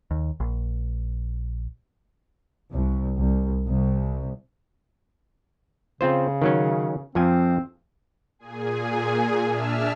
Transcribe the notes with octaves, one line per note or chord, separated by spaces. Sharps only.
D#2
A#1
C2
C2
C2
C#3 C4 F4 C5
D#3 F#3 C#4
F2 F3 C4 G#5
A#2 G#4 G#5
D4 E5 A5 E6 F6